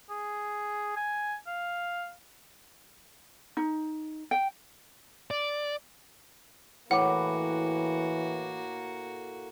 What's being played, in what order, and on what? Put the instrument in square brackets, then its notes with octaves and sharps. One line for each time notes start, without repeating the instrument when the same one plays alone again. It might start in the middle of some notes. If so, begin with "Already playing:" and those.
[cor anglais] G#4
G#5
F5
[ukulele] D#4
G5
[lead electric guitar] D5
[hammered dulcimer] A2 B5 D6 [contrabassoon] E3 [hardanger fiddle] A#3 F#4 [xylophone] F#5